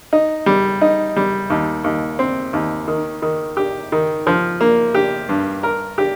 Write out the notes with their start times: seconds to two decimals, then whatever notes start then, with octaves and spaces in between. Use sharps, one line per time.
0.13 D#4
0.46 G3
0.81 D#4
1.16 G3
1.50 D#2
1.84 D#2
2.19 C4
2.53 D#2
2.88 D#3
3.22 D#3
3.57 G4
3.92 D#3
4.27 F3
4.61 A#3
4.95 G4
5.29 G2
5.63 A#4
5.98 G4